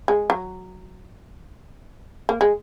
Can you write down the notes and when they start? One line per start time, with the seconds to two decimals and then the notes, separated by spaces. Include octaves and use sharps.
0.08 G#3
0.30 F#3
2.29 A#3
2.41 G#3